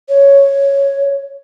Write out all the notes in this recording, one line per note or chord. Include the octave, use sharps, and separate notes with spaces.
C#5